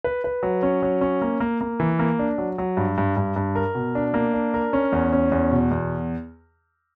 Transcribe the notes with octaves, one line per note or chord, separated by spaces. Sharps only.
B4
B4
F#3
C#4
F#3
C#4
A#3
A#3
A#3
E3
A#3
D4
F#3
F#3
G2
G2
G2
G2
A#4
B2
D4
A#3
D4
A#4
C#4
E2
C#4
E2
B2
E2